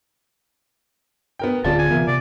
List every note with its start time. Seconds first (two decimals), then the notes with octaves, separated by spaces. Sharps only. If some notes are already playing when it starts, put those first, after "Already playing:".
1.39 B3 A#4 G5
1.65 D1 D3 C4 F4 G#4 D5 A5
1.78 G#5
1.90 C3 E3 B3 F4 A#4 E5
2.07 C3 D5